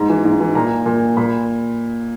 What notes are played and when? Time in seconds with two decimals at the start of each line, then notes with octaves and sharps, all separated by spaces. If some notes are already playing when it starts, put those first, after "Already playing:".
Already playing: G#2 A#5
0.09 E3
0.25 G#2
0.40 E3
0.55 A#2 A#5
0.86 A#2
1.17 A#2 B5